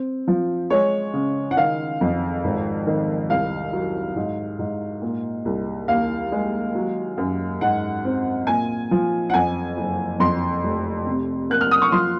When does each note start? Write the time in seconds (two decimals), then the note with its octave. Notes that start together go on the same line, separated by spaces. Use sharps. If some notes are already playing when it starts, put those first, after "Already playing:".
Already playing: C4
0.28 F3
0.70 G#3 C#5
1.14 C#3
1.51 F#5
1.57 D#3 F5
2.01 F2
2.44 G#1
2.87 D#3
3.29 C2 F5
3.73 F#3
4.16 G#2
4.59 G#2
5.02 A#2
5.45 C2
5.88 D#2 F5
6.32 G#3
6.75 F#3
7.17 F#2
7.61 G#2 F#5
8.05 C4
8.47 A#2 G#5
8.91 F3
9.30 F#5
9.34 F2 G#5
9.77 F#1
10.20 F2 C6
10.64 F1
11.07 C3
11.50 A#3 F#6
11.61 F6
11.71 D#6
11.82 C#6
11.92 F3 C6